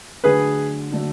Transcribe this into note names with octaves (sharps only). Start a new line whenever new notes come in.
D3 F#3 A3 D4 G#4 B4
D3 F#3 A3 D4